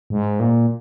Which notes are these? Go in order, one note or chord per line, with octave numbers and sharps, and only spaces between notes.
G#2
A#2